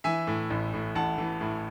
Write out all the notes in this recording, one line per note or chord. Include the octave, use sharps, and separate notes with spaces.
E3 E5 G#5
A2
A1
A2
A1 F#5 A5
E3
A2